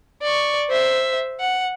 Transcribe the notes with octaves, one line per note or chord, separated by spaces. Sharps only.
D5 C#6
C5 E5
F#5